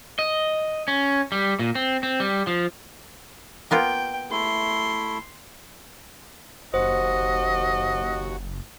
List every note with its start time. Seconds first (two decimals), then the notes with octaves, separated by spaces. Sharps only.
0.19 D#5
0.88 C#4
1.32 G3
1.59 A#2
1.75 C4
2.03 C4
2.20 G3
2.47 F3
3.71 A#3 B3 F4 G5
4.31 A3 E4 C6
6.74 F#1 D#2 F#4 C5 D#5 F#5